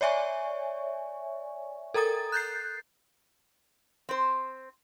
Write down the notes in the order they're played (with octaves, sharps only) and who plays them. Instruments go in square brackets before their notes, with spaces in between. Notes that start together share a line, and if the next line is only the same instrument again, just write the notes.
[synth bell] C#5 D5 E5 G#5 C#6
A4 A#4 A#5 D#6 A6
F#6 G6 A6 C7
[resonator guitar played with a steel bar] C4 C5